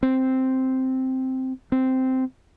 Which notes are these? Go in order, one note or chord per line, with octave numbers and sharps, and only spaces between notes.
C4
C4